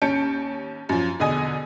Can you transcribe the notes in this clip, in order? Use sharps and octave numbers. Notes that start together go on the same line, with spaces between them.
D#2 C#4 A5 G6 C#7 D7
F#2 F3
E2 B2 D3 D#5 G#5 D#6